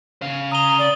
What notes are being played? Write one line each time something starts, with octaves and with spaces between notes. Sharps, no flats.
C#3 F5
A#5 D#6 D#7 G7
D5